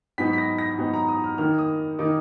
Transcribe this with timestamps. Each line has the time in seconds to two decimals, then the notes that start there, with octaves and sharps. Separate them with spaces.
0.18 G#2 F#3 B3 D#4 B6
0.33 B6
0.38 A#6
0.58 A#6
0.78 G#2 F#3 B3 D#4
0.94 A#5
1.09 D#6
1.24 F6
1.38 D#3 A#3 D#4 F6
1.58 D#6
1.99 D#3 A#3 D#4 D6